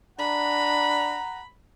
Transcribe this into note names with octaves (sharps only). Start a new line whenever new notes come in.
D4 F#5 A#5 B5